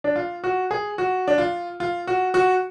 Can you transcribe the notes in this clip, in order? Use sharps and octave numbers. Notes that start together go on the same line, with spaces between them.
D4
F4
F#4
G#4
F#4
D4
F4
F4
F#4
F#4